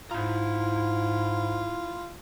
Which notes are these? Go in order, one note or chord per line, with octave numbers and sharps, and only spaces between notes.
G#2 E4 F4 A#5